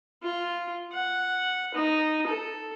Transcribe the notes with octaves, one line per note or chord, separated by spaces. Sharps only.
F4
F#5
D#4
A4